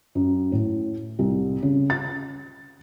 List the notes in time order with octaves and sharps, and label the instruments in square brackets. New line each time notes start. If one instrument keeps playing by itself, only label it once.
[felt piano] F#2
A2
C2
C#3
A6